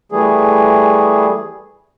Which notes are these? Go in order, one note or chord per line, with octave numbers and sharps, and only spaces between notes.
E3 G3 A3 G#4